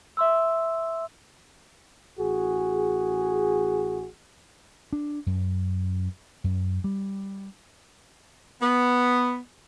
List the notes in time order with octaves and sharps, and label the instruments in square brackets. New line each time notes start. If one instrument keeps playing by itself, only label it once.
[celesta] E5 C6 E6
[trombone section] A1 F#4 G#4
[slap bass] D4
F#2
F#2
G3
[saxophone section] B3